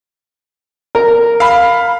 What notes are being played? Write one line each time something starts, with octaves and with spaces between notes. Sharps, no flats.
A#4 A#5
F5 B5